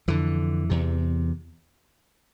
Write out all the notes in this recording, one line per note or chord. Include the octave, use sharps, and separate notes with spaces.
F2 D3 E3
E2 C3